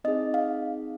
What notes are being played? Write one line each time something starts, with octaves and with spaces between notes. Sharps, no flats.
C4 D#4 G#4 D#5
F5